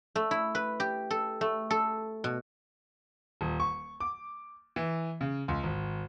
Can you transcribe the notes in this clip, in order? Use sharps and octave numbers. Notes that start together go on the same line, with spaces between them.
A3
E4
B4
G4
A4
A3
A4
B2
D#1
C#6
D6
E3
C#3
C#2
G#1